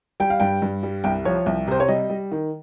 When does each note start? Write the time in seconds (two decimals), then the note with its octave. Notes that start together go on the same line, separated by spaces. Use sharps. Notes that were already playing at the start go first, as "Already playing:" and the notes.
0.20 G3 G5
0.30 F5
0.40 G2 G5
0.62 G2
0.83 G3
1.04 C2 G5
1.25 F3 C#5
1.46 C2
1.68 C3 C5
1.80 C#5
1.88 G3 D#5
2.10 G3
2.31 D#3